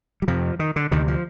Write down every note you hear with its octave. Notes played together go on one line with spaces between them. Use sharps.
G3
F2 C3 F3
D#3
D3
D2 C3 D#3
F3